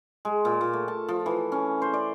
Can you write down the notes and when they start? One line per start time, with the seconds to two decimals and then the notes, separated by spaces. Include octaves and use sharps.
0.25 G#3
0.45 A#2
0.61 A#2
0.73 A3
0.88 A5
1.08 F3
1.26 E3
1.52 C#4
1.82 C5
1.94 D5